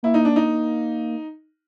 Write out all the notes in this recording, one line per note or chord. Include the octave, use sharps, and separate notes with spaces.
A#3 E4
D#4
D4
D#4